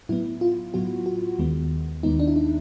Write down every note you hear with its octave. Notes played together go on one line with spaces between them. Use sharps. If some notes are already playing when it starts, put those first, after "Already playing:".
A2 F#3 B3 E4
F4
A2 F#3 B3 F#4
F#4
D#2 D#3 G#3 B3
D#2 D#3 G#3 B3 D#4
D4
E4
D#4